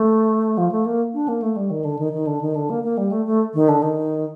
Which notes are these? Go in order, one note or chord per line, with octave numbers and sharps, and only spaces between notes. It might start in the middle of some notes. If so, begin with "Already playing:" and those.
Already playing: A3
F3
A3
A#3
D4
A#3
A3
G3
D#3
D3
D#3
D#3
D3
D#3
D3
A#3
A#3
G3
A3
A3
D#3
D3
D#3